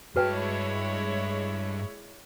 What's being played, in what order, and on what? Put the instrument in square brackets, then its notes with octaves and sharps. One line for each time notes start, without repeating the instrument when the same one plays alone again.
[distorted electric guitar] G2 A5 [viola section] G#3 E4 C#5 [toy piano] F#4 B4 G5